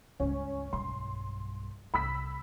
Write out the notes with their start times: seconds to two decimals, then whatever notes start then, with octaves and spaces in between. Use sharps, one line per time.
0.20 C#2 G2 C#4
0.73 B1 G2 C6
1.94 C2 B5 E6 B6